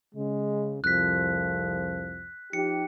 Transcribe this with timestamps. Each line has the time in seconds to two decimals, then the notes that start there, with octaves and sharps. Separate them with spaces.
0.15 C#3 G#3
0.84 C2 F2 F3 F#6 B6
2.53 F3 D#4 G4 C#7